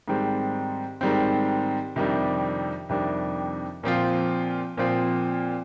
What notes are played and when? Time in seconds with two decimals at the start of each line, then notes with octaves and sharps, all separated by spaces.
0.08 G#2 D#3 G3 C4
1.01 G#2 D#3 G3 C4
1.96 F2 C3 D#3 G3 D4
2.89 F2 C3 D#3 G3 D4
3.83 A#2 F3 C4 F4
4.77 A#2 F3 C4 F4